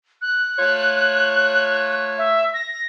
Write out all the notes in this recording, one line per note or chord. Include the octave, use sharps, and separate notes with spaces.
F#6
A3 F4 C#5
E5
A#6